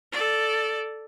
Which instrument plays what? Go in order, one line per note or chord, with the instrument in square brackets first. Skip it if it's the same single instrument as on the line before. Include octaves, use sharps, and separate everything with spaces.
[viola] A4 D5